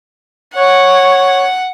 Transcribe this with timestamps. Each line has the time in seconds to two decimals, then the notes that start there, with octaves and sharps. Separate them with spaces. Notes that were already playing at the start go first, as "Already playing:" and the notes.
0.55 C#5 F#5